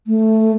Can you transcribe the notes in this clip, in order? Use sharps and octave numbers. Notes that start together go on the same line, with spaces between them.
A3